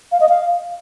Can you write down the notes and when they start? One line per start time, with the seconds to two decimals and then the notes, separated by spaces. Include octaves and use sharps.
0.12 F5
0.20 D#5
0.29 F5